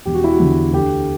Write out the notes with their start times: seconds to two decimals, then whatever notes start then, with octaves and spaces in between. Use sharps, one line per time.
0.06 E1 G4
0.14 F#4
0.24 E4
0.33 F#4
0.40 E2 D3
0.73 D2 G4